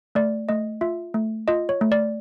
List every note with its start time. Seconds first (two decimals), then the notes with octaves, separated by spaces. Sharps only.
0.15 A3 D5
0.49 A3 D#5
0.81 F4 E5
1.14 A3
1.48 F4 D#5
1.69 C#5
1.81 A3
1.92 D5